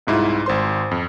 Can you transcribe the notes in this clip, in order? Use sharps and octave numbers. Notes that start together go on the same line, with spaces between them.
C2 G#2 E4 F4
G#1 C5 C6
F2